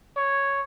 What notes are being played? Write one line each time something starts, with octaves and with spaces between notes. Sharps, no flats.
C#5